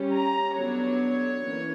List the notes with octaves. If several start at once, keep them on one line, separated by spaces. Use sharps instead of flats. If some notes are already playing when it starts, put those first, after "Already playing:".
Already playing: G3 C#4
A#5
D3 F#3 B3 D4 C#5
E3 A#3 C#4